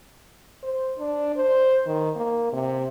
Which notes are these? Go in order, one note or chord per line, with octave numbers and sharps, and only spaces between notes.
C5
D4
C5
D#3
A#3
C3